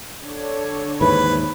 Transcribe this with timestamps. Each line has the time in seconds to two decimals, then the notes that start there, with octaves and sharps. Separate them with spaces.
0.23 D3 D4 C#5
1.01 D#2 G#2 E3 B4